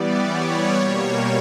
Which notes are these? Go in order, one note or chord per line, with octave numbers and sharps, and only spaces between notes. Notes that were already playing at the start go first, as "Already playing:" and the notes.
Already playing: E3 G3 B3 D5
C#5
B2 G3 A#3